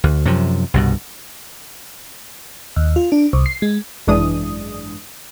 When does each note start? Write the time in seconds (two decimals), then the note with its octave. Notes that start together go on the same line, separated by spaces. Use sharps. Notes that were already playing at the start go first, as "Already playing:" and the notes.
0.04 D2
0.25 F#2 C3 F3
0.74 C2 G2 B2
2.76 D#2
2.96 F4
3.12 D4
3.33 C2
3.46 C7
3.62 G#3
4.07 G#1 F#2 E3 G#3 D4 D#6